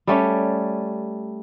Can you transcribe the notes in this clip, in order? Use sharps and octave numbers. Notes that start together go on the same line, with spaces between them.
G3 A3 C#4